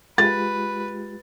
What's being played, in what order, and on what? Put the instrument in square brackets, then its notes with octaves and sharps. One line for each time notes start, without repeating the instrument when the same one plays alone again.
[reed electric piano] G#3 F4 G4 [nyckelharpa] B4 [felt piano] A6